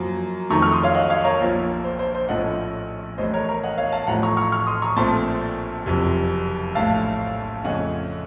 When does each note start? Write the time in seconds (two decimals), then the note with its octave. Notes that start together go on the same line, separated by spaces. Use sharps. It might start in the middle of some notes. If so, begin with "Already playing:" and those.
Already playing: F#2 F3 A#3
0.50 F2 D#3 A3 A#5 C#6
0.62 C#6 F6
0.72 C6 D#6
0.83 C#5 F5
0.95 D#5 F#5
1.10 C#5 F5
1.24 A#4 C#5
1.40 A#1 A#2 F3 A#3
1.84 C5
1.99 C5
2.15 C5
2.29 A#1 A2 F3 A3 C#4 D#5 F#5
3.18 A1 A2 A3 C5 D#5
3.34 A#4 C#5
3.49 A#4
3.63 D#5 F#5
3.78 C#5 F5
3.92 F5 A5
4.07 A1 A2 F3 A3 F#5 A#5
4.23 A#5 C#6
4.37 C#6 F6
4.52 C#6 F6
4.67 C6 D#6
4.82 A#5 C#6
4.96 A#1 A#2 A3 C4 A5 C6
5.86 F#1 F2 C3
6.75 A#1 A2 A3 F5 A5
7.64 F2 C#3 A3 C#4 D#5 F#5